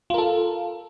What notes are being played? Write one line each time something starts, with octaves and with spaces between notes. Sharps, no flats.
F4 A4 A#4